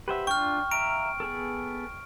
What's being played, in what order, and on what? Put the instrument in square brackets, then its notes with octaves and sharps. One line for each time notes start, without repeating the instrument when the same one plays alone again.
[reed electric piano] G4 F#5 [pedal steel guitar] B4 C5 E5
[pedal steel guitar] D4 F4 [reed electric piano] G5 [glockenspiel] C#6 F6
[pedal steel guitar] E5 F5 A#5 [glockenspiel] D7
[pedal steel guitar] B3 G#4 A4